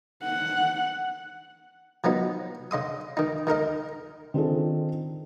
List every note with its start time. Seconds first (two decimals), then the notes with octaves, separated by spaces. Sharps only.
0.23 F#5
2.04 F3 F#3 B3 D#4
2.71 C#3 D#5 C6 D#6
3.17 D#3 D#4
3.47 D#3 D#4 A#4 D#5
4.34 D#3 C4 D4 F4 G#4 A4